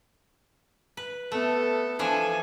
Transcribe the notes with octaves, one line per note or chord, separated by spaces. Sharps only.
B4
A3 B3 A4
E3 F3 D4 A4 G#5